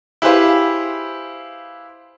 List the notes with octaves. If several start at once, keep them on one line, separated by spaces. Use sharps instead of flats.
E4 G4 G#4 B4 C5 F5